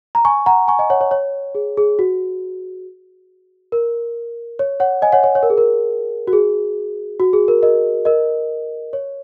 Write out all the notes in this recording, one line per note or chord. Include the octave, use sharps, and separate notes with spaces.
A#5
G#5 C#6
F#5 A#5
G#5 C#6
D#5 G#5
C#5 F#5
C#5
C#5
G#4
G#4
F#4
A#4
C#5
C#5 F#5
D#5 G#5
C#5 F#5
C#5
C#5
A#4
G#4
A#4
F#4
G#4
F#4
G#4
A#4
A#4 D#5
A#4 D#5
C#5